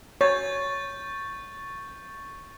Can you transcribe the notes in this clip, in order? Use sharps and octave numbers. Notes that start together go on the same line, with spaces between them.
C#5 C#6 G6 A6